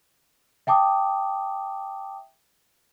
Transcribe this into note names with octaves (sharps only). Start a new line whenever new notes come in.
E5 G5 A5 D6 D#6